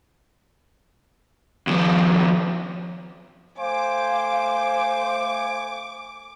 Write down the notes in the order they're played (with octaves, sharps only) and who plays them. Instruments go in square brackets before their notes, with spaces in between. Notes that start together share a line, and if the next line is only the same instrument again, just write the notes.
[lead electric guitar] D#2 F3
[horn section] A3 G5 G#5 [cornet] C5 [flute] F5 [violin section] D6